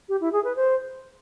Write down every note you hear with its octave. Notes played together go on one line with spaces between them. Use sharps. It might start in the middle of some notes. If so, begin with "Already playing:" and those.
G4
E4
G#4
B4
C5